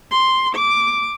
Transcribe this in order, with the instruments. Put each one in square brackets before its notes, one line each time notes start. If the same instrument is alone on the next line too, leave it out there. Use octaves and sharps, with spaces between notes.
[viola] C6
D6